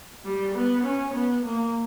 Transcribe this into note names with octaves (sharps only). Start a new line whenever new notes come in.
G3
B3
C#4
B3
A#3